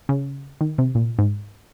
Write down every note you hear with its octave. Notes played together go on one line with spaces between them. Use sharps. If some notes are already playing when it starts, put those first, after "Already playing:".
C#3
D#3
C3
A#2
G#2